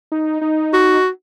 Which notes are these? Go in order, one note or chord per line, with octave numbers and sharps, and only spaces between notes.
D#4
D#4
F#4